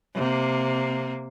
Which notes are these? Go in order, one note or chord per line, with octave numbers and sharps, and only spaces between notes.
C3 A#3